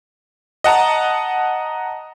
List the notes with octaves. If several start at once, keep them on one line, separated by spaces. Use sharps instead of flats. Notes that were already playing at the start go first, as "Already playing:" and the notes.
D#5 F#5 A5 A#5